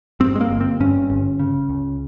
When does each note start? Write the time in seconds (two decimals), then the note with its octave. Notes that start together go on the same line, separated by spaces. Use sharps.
0.20 G2 C4
0.36 G#3
0.41 A#3
0.51 G1
0.61 C4
0.80 G2 C#4
1.10 G1
1.39 C#3
1.69 C#2